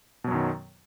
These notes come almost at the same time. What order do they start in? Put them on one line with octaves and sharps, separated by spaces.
B2 F#3 F#2 D#3